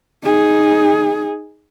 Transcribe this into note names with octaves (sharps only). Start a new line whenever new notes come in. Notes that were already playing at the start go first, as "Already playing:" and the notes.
D#4 G#4